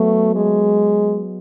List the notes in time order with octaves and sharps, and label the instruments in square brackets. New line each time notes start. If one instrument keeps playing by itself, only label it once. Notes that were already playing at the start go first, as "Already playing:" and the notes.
Already playing: [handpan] F#3 B3 F#4 B4 [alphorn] A3
[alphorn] G#3